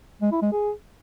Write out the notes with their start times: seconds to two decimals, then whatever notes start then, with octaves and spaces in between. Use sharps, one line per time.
0.22 G#3
0.32 E4
0.42 G#3
0.52 G#4